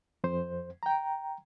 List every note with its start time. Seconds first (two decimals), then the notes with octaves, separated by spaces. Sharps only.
0.24 F2 C5
0.83 G5 A#5